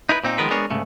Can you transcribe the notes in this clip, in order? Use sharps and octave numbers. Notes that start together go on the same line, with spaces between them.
D#4 E4 A#4 B4
A#2 C4 D#4
D#3 F3 G#3 B3 A#4 B4
G#3 B3 D4 G#4 A#4 C#5
C2 G#2 C#3 A3